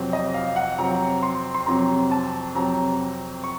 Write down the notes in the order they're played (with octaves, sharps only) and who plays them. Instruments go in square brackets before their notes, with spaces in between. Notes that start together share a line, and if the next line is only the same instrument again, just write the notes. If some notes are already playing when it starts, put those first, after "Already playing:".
Already playing: [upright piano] F2 C3 F#3 C4
D#5
F5
F#5
F2 C3 F#3 C4 A#5
C6
C6
F2 C3 F#3 C4 A#5
A5
F2 C3 F#3 C4 A#5
C#6